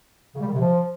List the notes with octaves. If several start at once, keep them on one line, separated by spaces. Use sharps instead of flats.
C#3
G3
D#3
C3
F3